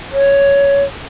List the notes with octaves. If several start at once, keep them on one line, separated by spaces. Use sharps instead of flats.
C#5